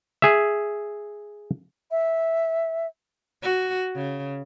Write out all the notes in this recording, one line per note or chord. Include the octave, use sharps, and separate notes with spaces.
G#4 E5
E5
F#4
C#3